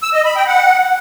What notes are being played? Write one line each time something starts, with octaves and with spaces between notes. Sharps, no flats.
E6
D#5
B5
G5
F#5